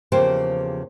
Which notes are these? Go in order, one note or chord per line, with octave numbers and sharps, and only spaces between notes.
E2 C#3 F3 A#3 G4 C5